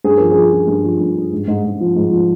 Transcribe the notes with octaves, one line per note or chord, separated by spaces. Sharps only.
G2 G#4
F3 A#4
G#4
F3
F3
G2
F3
G2
G2
G#2
G#2
G#2
F3
G#2
F3